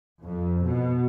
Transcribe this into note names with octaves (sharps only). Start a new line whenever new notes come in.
F2
B2